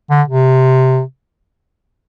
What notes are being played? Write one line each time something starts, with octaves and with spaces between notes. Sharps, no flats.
D3
C3